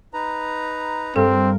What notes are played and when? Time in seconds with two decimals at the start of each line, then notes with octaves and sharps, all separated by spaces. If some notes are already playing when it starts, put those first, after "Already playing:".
0.13 D#4 B4 A#5
1.16 G2 C4 A4 A#4